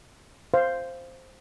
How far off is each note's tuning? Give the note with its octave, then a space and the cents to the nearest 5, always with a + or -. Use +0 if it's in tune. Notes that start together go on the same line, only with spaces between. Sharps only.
C5 +0 F5 -15